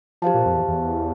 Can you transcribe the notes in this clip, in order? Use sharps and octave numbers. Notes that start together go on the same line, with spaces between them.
F3 G4 C5 F5 A5
A#2
F2
E2
E2